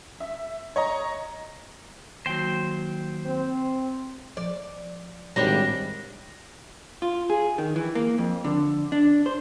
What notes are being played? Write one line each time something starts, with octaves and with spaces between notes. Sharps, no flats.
E5
C#5 D#5 A#5
D#2 F#3 C5 G5
C4
F3 D5
G#1 A2 G3 D4 G4 C#5 G5 A#6
F4
G#4
D#3
E3
A#3
F2
D3
D4
C5